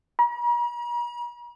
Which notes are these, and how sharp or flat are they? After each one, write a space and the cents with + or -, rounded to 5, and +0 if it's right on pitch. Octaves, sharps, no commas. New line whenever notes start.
A#5 +45